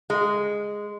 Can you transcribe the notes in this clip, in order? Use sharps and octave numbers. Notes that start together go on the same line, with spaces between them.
G#3